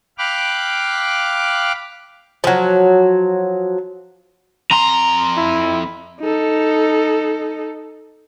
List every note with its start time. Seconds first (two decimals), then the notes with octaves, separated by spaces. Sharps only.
0.18 F5 G5 B5 D6 F6 F#6
2.44 F3 F#3
4.71 F2 A#5 C6
5.37 E4
6.21 D#4 A4